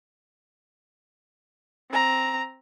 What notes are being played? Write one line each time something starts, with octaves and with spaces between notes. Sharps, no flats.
C4 A#5